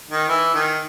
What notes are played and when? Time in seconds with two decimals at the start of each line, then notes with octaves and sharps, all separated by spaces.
0.11 D#3
0.28 E3
0.54 D#3